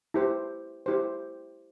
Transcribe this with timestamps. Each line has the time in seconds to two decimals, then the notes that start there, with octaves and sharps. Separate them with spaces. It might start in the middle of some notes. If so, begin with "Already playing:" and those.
0.14 E4 G4 C5
0.86 E4 G4 C5